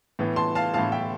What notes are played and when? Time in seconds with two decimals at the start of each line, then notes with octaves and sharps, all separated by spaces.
0.19 A2 E3 B3
0.36 A5 C6
0.55 F5 A5
0.74 A2 E3 B3 F5 A5
0.92 E5 G5